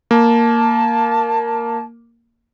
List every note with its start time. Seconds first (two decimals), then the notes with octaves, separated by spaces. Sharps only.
0.11 A#3 A5